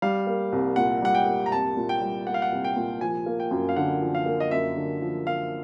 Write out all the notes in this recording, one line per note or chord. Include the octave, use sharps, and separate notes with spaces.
G3 F5
A#3
C2
A#2 F#5
G3 F#5
G5
A#3
A#5
C2 A5
A#2
G5
G3
A#3 F#5
F5
F#5
C2
G5
A#2
F3 G#5
A#3
G5
F#2
F5
D3 F#5
F3
F5
A#3
D#5
F#2 E5
D3
F3
A#3 F5